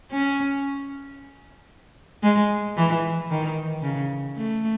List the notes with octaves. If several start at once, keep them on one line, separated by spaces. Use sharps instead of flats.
C#4
G#3
E3
D#3
C#3
A3